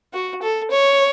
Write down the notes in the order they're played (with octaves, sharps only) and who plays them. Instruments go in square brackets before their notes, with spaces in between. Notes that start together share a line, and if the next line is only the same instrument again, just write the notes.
[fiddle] F#4
A4
C#5